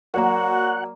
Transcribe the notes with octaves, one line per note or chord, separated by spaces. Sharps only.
F#3 A#3 F#4 A#4 D5 F#5 A#5